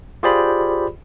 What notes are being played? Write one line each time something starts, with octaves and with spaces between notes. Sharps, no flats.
F4 G4 G#4 C5 D5 B5